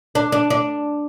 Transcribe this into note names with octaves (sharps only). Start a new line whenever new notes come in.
D4
D4
D4